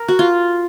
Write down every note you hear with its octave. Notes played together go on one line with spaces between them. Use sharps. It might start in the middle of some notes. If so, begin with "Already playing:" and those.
Already playing: A#4
F#4
F4